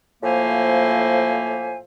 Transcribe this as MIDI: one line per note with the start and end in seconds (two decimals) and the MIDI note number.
0.23 1.78 45
0.23 1.78 53
0.23 1.78 58
0.23 1.78 72
0.23 1.78 76
0.23 1.78 80